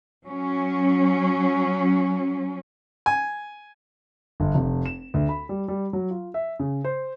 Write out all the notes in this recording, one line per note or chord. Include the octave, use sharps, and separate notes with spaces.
F#3 C#4
G#5
G1
F1
E7
D2
B5
G3
G3
F#3
F4
E5
C#3
C5